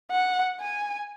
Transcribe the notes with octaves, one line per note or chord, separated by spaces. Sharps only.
F#5
G#5